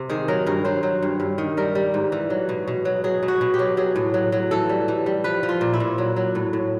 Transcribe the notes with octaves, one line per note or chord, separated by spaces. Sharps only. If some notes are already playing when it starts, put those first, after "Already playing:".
Already playing: C3
D#3 G#4
F#3 A#4
G2 A#4
F#3 C5
F#3
G2
G2
D#3
G3 A#4
G3
G#2
E3
F#3
B2
B2
F#3
F#3 G#4
B2
F#4
B2
G4
F#3
F#3 G#4
A2
F#3
F#3
E3 A4
G3
E3
G3
F3 B4
F3
F4
A#2
E4
A#2
F#3
F#3
A2
A2